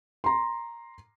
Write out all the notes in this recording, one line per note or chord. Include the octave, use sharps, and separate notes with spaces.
A#5 C6